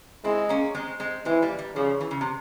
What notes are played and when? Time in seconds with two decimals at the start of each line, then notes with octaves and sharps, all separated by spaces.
0.24 G#3 C4 E4
0.49 A#3 C#4
0.75 G#3 C4
1.00 G#3 C4
1.25 E3 G#3 C4
1.42 G3 A#3
1.59 G3
1.76 C#3 F3
2.01 E3
2.11 C#3
2.21 C3